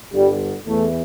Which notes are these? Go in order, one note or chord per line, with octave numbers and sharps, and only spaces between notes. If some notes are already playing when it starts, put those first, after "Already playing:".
G1 G2 D3 G3
E2 E3 A3